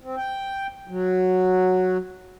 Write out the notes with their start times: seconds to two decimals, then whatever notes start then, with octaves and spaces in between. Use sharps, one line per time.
0.01 C4
0.16 G5
0.88 F#3